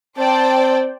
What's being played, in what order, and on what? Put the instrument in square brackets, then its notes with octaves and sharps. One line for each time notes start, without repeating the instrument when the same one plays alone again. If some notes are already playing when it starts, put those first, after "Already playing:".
[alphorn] C4 [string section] C5 D5 G5 [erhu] A5